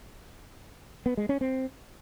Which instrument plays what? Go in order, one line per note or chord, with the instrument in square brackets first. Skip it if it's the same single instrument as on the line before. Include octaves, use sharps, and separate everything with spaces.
[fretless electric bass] B3
G#3
C#4
C4